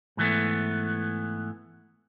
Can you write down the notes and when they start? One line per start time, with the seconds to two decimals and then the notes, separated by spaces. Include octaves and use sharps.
0.17 G#2 E3 A3 B3